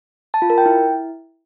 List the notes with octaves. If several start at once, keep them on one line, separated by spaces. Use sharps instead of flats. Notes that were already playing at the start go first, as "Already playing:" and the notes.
A5
F4
A#4
G5
E4